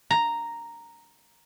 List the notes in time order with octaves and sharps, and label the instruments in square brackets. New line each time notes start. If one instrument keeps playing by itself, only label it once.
[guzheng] A#5